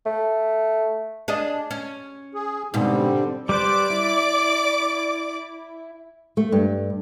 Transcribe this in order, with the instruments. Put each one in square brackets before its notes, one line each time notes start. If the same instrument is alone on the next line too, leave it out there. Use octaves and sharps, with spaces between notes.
[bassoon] A3
[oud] D4 G#4 D#5
C#4
[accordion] G#4
[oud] G#2 B2 [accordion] D3 G3 C4
[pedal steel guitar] G3 B4 C5 [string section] D5 D6
[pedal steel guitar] E4
[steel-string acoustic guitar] A3
G2